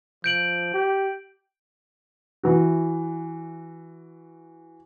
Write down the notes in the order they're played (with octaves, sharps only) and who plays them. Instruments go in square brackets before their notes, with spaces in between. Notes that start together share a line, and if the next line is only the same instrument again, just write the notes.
[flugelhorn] F3 [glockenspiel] G6 D7 F#7
[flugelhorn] G4
[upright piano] E3 F#4